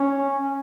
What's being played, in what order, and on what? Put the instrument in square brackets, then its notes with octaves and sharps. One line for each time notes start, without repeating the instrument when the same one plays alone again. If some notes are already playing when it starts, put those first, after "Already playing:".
Already playing: [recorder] C#4